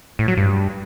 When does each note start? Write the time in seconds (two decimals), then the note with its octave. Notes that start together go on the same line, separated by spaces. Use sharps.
0.19 A2
0.28 F#3
0.37 G2